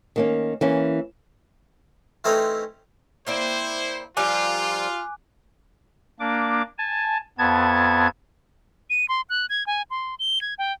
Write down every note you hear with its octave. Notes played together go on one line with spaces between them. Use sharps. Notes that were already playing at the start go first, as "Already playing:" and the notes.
D#3 A#3 C#4
E3 A#3 C#4
E3 A3 C4 C#4 D#4
A#3 C4 E4 C5 D5
F3 G3 F4 A#4 G#5 D6 F#6
A#3 D4 D6
G#5 A5
F2 B3 A5 G#6
D#7
C6
F#6
G#6
G#5
C6
G7
G#6
G5